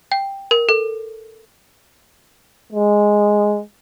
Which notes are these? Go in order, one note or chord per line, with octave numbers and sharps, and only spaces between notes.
G5
A#4
A4
G#3